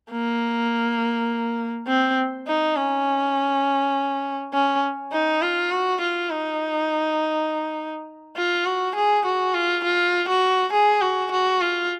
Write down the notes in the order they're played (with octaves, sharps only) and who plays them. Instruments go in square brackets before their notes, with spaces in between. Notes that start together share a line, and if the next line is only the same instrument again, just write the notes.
[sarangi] A#3
C4
D#4
C#4
C#4
D#4
F4
F#4
F4
D#4
F4
F#4
G#4
F#4
F4
F4
F#4
G#4
F#4
F#4
F4